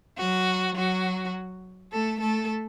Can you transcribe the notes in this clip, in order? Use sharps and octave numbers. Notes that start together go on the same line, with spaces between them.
F#3 F#4
F#3 F#4
A3 A4
A3 A4